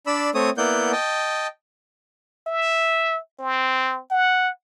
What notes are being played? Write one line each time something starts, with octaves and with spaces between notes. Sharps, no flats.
D4 D5 B5 E6
A3 C4 C#5 D#6
A#3 B3 E4 D5 F#5 G6
D#5 G5 A5
E5
C4
F#5